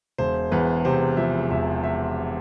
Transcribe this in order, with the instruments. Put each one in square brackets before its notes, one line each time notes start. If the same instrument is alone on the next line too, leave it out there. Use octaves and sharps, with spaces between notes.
[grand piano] E1 C5
E2 B4
C3 C5
F3 E5
E1 E5
E5